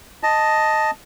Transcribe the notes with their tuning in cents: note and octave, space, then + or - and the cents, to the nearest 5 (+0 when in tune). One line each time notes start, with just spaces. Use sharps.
D#5 +0 A5 +0